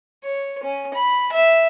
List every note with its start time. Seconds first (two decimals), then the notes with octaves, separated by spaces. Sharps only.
0.24 C#5
0.63 C#4
0.94 B5
1.33 E5